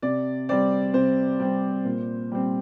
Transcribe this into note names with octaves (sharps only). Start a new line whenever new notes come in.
C3 D5
G3 C4 D5
C3 C5
G3 C4
A#2
G3 C4